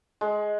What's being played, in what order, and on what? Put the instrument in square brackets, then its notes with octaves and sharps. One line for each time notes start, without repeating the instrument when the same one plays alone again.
[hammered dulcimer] G#3